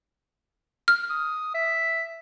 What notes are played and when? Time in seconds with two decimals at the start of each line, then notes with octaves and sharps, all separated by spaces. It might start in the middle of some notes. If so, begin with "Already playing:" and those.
0.88 F6
1.10 D#6
1.54 E5